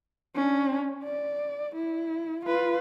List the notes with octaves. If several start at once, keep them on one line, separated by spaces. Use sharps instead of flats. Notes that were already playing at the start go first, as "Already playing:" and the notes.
C#4 D4
D5
E4
F4 B4